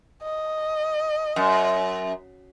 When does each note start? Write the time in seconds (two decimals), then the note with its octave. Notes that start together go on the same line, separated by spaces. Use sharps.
0.23 D#5
1.36 F#2